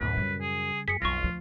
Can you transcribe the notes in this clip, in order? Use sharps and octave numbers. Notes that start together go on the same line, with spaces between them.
D1 F#2 B4
C#3 G3
G#4
F#2 G#4 B6 C#7
B1 F2 F#3 F4 C#6 A#6
D2 F3